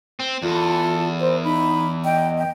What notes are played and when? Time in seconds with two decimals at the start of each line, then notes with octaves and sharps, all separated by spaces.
0.20 C4
0.42 E2 F4 A4
1.20 A#4 C5
1.44 D#4 B5
2.05 D#5 G5
2.38 G5